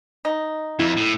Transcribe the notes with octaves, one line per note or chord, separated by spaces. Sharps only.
D#4
F2 E4
A2